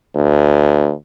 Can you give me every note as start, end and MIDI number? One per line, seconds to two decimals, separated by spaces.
0.15 0.92 38